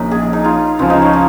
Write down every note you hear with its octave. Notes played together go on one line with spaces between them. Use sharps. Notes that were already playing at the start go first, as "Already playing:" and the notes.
Already playing: A#1 A#2 A#3 C#4 D#4
G#4
D#4
F4
C#2 C#3 F3 F4
D#4
C#4
D#4